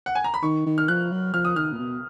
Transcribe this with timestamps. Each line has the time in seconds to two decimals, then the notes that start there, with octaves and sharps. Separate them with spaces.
0.06 F#5
0.15 G#5
0.24 A#5
0.34 B5
0.43 D#3 C#6
0.66 D#3
0.78 F6
0.88 F3 F#6
1.11 F#3
1.34 F3 F6
1.45 D#6
1.56 D#3 F6
1.72 A#2
1.79 B2